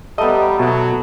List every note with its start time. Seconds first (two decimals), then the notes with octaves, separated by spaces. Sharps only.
0.18 G3 A3 B3 A4 D#5 A#5
0.59 B2 F#3 E5